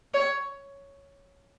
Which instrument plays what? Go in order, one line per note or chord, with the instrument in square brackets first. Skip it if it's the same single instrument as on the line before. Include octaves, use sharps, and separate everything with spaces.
[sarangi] C#5